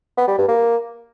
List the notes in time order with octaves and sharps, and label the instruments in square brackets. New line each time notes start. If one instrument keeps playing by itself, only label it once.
[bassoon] B3
G3
G2
A#3